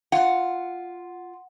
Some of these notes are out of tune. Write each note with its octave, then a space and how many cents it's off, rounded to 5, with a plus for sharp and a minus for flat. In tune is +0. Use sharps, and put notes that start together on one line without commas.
F4 +0 F#5 -5